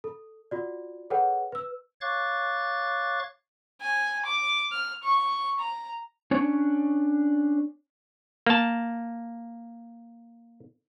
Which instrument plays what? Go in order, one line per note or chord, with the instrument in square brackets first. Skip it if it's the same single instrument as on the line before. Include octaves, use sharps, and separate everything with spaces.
[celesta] A4
F4 F#4 D5
G#4 A4 B4 C#5 F#5 G5
B4 E6
[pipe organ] C#5 F5 C#6 D6 F#6 A6
[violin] G#5
D6
F6
C#6
A#5
[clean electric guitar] C#4 D4 C#5
[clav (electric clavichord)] A#3 A5